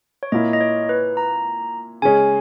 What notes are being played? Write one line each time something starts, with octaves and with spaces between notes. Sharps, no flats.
C#5
A#2 A#3 E4 D#5
D#5
C#5
B4
A#5
C#3 G#3 C#4 G#4 G#5